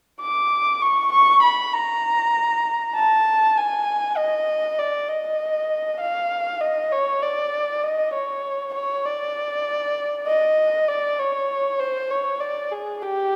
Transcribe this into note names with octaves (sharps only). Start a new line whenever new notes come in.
D6
C#6
C#6
B5
A#5
A5
G#5
D#5
D5
D#5
F5
D#5
C#5
D5
D#5
C#5
C#5
D5
D#5
D5
C#5
C5
C#5
D5
G#4
G4